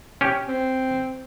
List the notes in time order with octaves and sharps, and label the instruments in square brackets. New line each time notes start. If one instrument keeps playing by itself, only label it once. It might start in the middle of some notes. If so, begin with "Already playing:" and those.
[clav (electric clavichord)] C#4 G4
[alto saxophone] C4